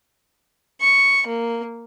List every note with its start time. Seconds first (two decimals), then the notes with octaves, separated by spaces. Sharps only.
0.81 C#6
1.27 A#3